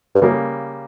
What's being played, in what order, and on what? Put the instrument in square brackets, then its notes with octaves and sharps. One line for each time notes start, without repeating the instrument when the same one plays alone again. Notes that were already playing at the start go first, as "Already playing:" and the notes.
[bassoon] G2
[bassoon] F#2 [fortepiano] C#3 G3 A#3